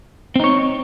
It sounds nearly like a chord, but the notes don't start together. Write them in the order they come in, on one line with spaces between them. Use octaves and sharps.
C4 D#4 C#5